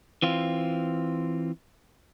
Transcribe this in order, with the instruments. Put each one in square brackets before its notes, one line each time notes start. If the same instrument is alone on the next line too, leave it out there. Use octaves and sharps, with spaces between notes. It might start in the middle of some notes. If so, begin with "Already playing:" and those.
[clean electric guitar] E3 C4 F4